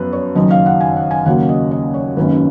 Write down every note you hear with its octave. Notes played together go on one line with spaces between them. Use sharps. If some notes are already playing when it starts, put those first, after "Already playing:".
Already playing: F#2 F3 B3 B4
C#5
F#1 F#2 D#3 D#5
F5
F#5
G#5
F#5
G#5
D#2 C#3 F#3 A#3 C#4 F#5
D#5
D#5
C#5
G#1 F#2 D#3 A#3 C#4 B4